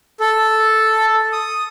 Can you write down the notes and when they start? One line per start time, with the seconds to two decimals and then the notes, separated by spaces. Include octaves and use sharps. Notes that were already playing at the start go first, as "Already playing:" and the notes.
0.20 A4
1.33 D#6